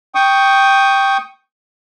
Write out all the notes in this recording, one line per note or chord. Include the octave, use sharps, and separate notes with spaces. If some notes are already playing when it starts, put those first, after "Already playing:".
G5 C#6 D#6